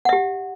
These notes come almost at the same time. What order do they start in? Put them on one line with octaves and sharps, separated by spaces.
F#5 E5 G4